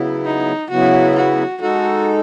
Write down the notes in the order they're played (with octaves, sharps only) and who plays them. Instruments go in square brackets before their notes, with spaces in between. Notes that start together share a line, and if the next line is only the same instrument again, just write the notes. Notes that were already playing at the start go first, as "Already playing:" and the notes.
Already playing: [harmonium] C#3 F#3 B3 E4
[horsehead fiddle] D#4
[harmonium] C#3 F#3 B3 E4 [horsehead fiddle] F#4
[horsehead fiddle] F#4
[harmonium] G#3 D#4 A4 [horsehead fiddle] F#4